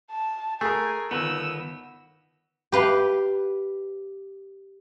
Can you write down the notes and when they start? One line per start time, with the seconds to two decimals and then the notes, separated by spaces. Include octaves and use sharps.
0.11 A5
0.61 A3 G#4 A#4 G#5
1.11 G1 D#3 B3 E6
2.72 G4 B4 F5